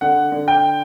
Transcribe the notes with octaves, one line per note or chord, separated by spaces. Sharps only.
D3 F#5
D3
G5